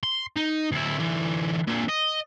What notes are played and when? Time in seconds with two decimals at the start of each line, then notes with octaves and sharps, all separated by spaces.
0.03 C6
0.36 D#4
0.72 D2 E4
0.99 D3 E3
1.67 A#2 D3
1.89 D#5